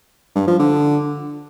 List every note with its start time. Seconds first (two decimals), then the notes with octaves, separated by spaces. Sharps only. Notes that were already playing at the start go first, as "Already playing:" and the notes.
0.35 G2
0.47 F3
0.59 D3